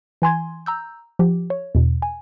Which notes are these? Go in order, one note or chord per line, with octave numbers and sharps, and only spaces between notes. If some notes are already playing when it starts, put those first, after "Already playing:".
E3 G#5 C6 G#6
A#5 E6 G6
F3 G4
C#5
E2 B2
G#5